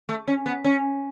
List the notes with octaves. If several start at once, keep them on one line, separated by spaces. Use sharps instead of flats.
A3
C#4
B3
C#4